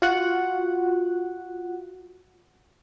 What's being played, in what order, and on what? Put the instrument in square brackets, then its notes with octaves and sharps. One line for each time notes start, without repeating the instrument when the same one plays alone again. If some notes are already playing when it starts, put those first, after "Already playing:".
[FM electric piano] F4 F#4 F#5